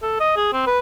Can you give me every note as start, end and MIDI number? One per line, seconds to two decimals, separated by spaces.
0.03 0.18 69
0.20 0.32 75
0.37 0.50 68
0.53 0.66 60
0.67 0.79 71